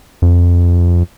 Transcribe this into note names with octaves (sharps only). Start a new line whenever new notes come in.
F2